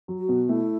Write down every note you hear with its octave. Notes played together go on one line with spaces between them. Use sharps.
F#3
F#4
B2
A3 E4